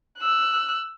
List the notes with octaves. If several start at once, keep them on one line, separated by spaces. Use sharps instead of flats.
E6 F#6